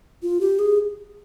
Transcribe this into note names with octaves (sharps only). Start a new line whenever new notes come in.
F4
G4
G#4